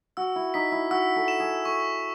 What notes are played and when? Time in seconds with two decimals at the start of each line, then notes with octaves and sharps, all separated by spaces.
0.17 F#4 E6
0.36 E4
0.54 D#4 B6
0.72 E4
0.91 F#4 E6
1.16 A4
1.28 E7
1.40 G#4
1.65 A4 C#6